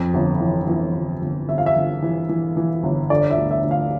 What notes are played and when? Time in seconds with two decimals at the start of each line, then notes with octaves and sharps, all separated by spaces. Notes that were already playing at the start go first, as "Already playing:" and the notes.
Already playing: F2
0.14 G1
0.40 E3
0.68 E3
0.95 G1
1.22 G1
1.48 G1 E5
1.58 F5
1.66 E5
1.76 G1
2.02 E3
2.29 E3
2.57 E3
2.83 G1
3.10 D3 D5
3.31 E5
3.37 D2
3.51 E5
3.64 D2
3.71 F5